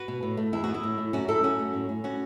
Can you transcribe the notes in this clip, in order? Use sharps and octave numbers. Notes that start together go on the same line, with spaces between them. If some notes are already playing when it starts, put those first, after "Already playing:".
Already playing: F#4 B4
B2
A2
A3
E2 E4
B3 F#4
E4
A2
A3
F#2 C#4 F#4
A3 E4 A4
F#2 C#4 F#4
A3
A2
A2
C#4 F#4